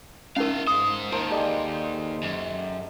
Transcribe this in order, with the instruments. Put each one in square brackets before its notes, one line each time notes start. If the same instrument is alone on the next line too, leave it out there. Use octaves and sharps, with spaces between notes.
[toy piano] C#4 D#4 A#4 [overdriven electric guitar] E4 F5
[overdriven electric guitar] G#2 C5 [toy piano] D#6
[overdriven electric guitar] D#2 D#3 [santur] A#4 C5 A5
[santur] G3 G#3 A4
[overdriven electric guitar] F#2